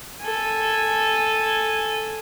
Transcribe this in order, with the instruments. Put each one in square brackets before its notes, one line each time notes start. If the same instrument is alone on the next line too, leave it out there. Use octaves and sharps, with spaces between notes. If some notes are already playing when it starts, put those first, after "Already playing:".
[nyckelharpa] A4 G#5